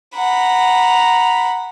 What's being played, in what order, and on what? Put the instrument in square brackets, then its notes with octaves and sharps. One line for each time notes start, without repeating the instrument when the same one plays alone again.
[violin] F#5 B5 [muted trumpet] A#5